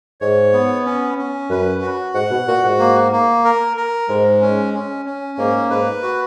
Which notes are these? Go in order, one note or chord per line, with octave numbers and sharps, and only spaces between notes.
G#2 C#5
B3
C#4
C#4
F#2 B4
F#4
G#2 F#5
B2
A#2 F#4
G#2
A#3
A#3
A#4
A#4
G#2 G#3
C#4
C#4
C#4
G#2 A#3
G#2 B4
F#4